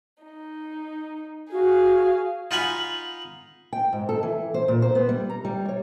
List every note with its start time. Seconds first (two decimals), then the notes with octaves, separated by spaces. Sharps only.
0.23 D#4
1.52 F#4 G#4 F5
2.51 D#4 F4 F5 F#5 G#5 B5
3.73 G5
3.93 G#2
4.09 A4
4.23 E3
4.54 C5
4.68 A#2
4.82 C5
4.95 B3
5.09 G3
5.30 A#5
5.45 G3
5.68 C#5